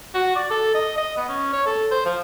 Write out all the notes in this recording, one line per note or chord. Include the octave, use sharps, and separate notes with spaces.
F#4
D5
A4
D#5
D#5
B3
C#4
C#5
A4
C5
F3